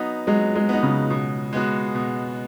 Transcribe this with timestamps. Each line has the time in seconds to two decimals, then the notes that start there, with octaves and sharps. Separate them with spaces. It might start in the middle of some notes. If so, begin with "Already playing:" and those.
Already playing: F#3 B3 D#4
0.27 F#3 G#3
0.55 G#3
0.69 B3 D#4
0.83 C#3
1.10 B2
1.53 G#3 B3 F#4
1.95 B2